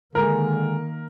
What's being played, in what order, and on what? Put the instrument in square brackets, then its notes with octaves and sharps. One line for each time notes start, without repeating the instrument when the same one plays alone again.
[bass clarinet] D3 [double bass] D#3 A#3 [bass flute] G#3 [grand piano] A#4